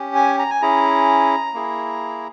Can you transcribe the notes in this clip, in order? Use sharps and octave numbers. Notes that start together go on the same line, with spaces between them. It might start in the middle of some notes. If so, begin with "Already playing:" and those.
Already playing: C#4 G4
G#5
A#5
G#5
C#4 E4 G#4 A#5
A#3 E4 G#4